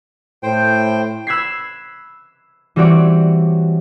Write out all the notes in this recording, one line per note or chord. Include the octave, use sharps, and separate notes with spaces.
A2 C5 G5
B5 E6 F#6 G#6 B6 C7
E3 G3 C4 F#4 C#5 D5